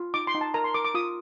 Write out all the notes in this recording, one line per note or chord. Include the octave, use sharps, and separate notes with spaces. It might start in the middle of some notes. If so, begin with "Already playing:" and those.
Already playing: F4
D#4 D6
C6
D#4
A5
A#4 A#5
C6
A#4 D6
D6
F4 D#6